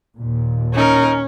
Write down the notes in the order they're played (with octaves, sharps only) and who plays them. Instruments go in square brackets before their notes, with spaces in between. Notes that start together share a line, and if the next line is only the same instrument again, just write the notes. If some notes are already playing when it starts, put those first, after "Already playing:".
[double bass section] D#2 A#2
[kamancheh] C#4 [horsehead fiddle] D#4 A#4